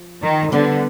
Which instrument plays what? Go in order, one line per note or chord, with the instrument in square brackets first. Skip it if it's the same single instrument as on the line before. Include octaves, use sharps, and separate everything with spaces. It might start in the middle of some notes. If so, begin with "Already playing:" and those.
Already playing: [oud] F3
[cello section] D#3
[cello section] D3 [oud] G3 B3